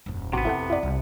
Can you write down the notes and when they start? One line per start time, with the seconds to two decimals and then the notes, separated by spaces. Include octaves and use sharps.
0.06 D#1 F#2
0.33 A1 C3 B3 D#4 F#4
0.45 F2 E4 A4 F#5
0.70 E4 D5
0.83 C2